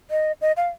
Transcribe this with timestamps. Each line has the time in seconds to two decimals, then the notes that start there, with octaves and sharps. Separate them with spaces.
0.11 D#5
0.41 D#5
0.57 F5